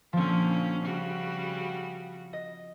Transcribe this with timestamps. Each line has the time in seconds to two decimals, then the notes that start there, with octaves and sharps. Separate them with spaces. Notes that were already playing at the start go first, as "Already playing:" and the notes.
0.13 A#2 D3 F3 C4 C#4
0.85 C#3 G3 F#4
2.33 D#5